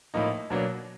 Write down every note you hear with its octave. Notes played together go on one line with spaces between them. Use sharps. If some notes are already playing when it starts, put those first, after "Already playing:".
A2 F3 A#3 D#4
B2 F#3 A#3 D4